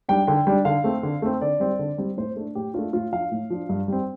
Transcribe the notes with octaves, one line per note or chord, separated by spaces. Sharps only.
G3 D4 G5
D3 G5
G3 D4
D3 F5
A3 C4
D3
A3 C4
D3 D5
G3 C4
D3
G3 C4
A2 C5
A3 D4
A2 G4
A3 D4 F4
A2 F4
F3 D4 F5
A2
F3 D4
G2
G3 C4